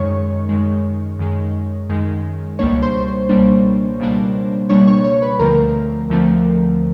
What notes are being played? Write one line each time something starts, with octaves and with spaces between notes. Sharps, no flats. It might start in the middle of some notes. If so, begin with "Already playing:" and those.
Already playing: F#2 D#3 G#3 C#5 C#6
F#2 D#3 G#3
F#2 D#3 G#3
F#2 D#3 G#3
C#2 B2 G3 A#3 D4 C#5 C#6
C5 C6
C#2 B2 G3 A#3 D4
C#2 B2 G3 A#3 D4
C#2 B2 G3 A#3 D4 C#5 C#6
C#5 C#6
C#5 C#6
B4 B5
D2 D3 F3 A3 C4 A#4 A#5
D2 D3 F3 A3 C4